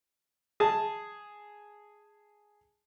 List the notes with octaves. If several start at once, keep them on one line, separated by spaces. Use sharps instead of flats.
G#4 A5